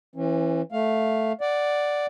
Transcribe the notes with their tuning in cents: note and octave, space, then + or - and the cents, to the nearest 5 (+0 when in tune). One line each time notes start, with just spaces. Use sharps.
E3 +0 C#4 -40
A3 +0 F5 +5
D5 +0 F#5 +0